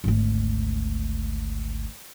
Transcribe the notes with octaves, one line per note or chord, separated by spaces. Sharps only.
G#1 D2